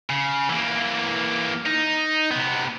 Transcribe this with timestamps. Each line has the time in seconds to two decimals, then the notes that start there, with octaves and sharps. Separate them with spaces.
0.10 C#3
0.49 E3 A#3
1.66 D#4
2.31 C3 B3